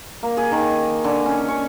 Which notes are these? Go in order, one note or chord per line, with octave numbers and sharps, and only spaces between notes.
A#3
G#4
D#3
D3
C#4
C#5